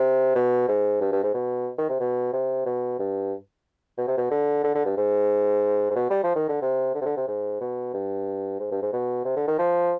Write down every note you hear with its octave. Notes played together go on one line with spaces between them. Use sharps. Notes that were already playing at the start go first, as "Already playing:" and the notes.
Already playing: C3
B2
G#2
G2
G2
G#2
B2
D#3
C3
B2
C3
B2
G2
B2
C3
B2
D3
D3
D3
G2
G#2
G#2
B2
G3
F3
D#3
D3
C3
D3
C3
D3
C3
G#2
B2
G2
G#2
G2
G#2
B2
C3
D3
D#3
F3